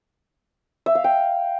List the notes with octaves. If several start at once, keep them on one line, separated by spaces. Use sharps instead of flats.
E5
F5
G5